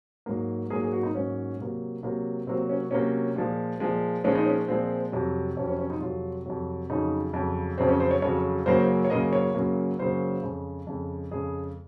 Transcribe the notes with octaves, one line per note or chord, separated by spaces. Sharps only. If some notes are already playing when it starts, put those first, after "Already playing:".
G#2 F#3 A#3
G#2 F#3 A#3 G#4
G#4
F#4
D#4
G#2 F#3 A#3 C#4
C3 F#3 A#3
C3 F#3 A#3
C3 F#3 A#3 C4
C#4
C3 F#3 A#3 C#4
A#2 F3 G#3
A#2 F3 G#3
A#2 F3 G#3 C#4
D#4
C#4
A#2 F3 G#3 C4
F2 C3 F#3
F2 C3 F#3 C#4
C#4
C#4
D#4
F2 C3 F#3 F4
F2 C3 F#3
F2 C#3 F#3 D#4
F2 C#3 F#3
F2 C#3 F#3 C4
C#4
C5
C#5
F2 C#3 F#3 C#5
F#2 C#3 F#3 A#3 C5
C#5
F#2 C#3 F#3 A#3 D#5
C#5
F#2 C#3 F#3 A#3
F#2 C#3 F#3 A#3 C5
F2 C#3 G#3
F2 C#3 G#3
F2 C#3 G#3 G#4